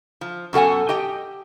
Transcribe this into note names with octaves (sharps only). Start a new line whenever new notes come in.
F3
F#2 B2 A4 F#5 G#5
G4 D#5 G5